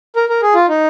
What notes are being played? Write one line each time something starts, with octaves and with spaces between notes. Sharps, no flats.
A#4
A#4
G#4
F4
D#4